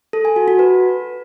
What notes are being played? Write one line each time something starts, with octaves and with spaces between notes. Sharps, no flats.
A4
G#5
F#4
F#4
B4